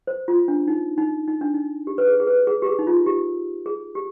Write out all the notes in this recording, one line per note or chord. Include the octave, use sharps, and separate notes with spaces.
C5
F4
D4
D#4
D#4
D#4
D4
D#4
G4
B4
G#4
G#4
B4
G#4
G4
G#4
D#4
F4
G4
G#4
G4